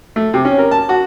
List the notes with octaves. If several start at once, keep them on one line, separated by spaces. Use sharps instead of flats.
A3
C3
C#4
A#4
A5
F#4